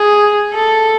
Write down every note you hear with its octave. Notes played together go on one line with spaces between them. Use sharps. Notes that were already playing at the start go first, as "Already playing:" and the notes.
Already playing: G#4
A4